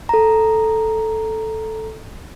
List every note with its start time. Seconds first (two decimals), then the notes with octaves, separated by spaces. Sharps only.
0.09 A4 A#5